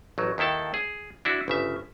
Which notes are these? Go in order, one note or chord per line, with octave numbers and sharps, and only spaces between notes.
A1 F#3
D#2 D#3 E4 A4 A5
G#4
D4 E4 F#4
G1 C#3 E5